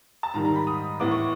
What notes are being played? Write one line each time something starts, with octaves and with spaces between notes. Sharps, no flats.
A5
G#2 D#3 G3 A#5
A#5
B5
D#6
A2 E3 G#3 B3 D6
C#6